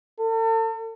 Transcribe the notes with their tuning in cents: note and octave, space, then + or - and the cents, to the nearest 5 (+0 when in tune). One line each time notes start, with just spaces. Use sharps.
A4 +40